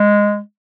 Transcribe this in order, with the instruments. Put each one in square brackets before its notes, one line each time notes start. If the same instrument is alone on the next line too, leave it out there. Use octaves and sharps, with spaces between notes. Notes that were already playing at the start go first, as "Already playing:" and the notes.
Already playing: [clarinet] G#3